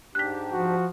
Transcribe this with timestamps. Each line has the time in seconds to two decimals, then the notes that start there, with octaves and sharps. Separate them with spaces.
0.15 G#2 D4 G4 F#6 B6
0.52 F3 F#4